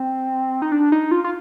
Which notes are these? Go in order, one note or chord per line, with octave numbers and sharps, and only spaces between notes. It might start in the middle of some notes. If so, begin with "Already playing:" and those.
Already playing: C4
D#4
D4
D#4
F4
F4